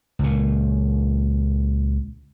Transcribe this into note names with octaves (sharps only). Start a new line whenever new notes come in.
C#2 A#2